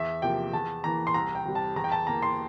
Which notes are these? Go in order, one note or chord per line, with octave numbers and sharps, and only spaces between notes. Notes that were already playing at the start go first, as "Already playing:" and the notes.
Already playing: E2 E5
C3 F3 A#3 G5
E2 A5
E3 A#3 A#5
C6
C2 A#5
G5
C3 G3
A5
E2 A#5
G5
A5
E3 A#3 A#5
C6